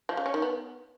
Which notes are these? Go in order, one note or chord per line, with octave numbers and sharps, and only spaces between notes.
F3
C#3
C#4
D#3
B3